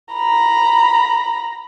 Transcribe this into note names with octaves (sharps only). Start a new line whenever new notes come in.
A#5 B5